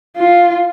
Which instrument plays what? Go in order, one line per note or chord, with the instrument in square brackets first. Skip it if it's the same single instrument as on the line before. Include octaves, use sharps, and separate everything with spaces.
[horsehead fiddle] F4